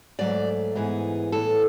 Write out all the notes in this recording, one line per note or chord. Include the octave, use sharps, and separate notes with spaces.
G#2 F#3 A3 D5
G#2 E3 B3 G#4
A2 E3 B3 A4